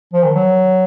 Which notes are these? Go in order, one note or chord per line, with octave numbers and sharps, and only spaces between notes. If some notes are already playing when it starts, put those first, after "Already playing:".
F3
D#3
F#3